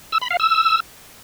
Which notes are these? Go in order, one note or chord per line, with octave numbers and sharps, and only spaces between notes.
E6
B5
F5
E6